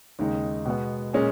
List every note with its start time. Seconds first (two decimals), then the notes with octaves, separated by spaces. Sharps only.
0.19 D#2 C#3 G#3 D#4
0.66 B2 G#3 B3
1.13 A#2 G#3 C#4 G#4